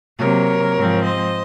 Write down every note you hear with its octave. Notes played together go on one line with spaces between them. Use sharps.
C3 F#3 A#3 A#4 C#5
G#2 F3 C4
C5 D#5